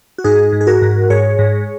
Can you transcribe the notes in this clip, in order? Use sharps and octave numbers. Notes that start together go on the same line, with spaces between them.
F#4
G#2 D#4 G#4
G#2
G#4
F#4 A#4
G#2
G#2 G#4 C#5
G#2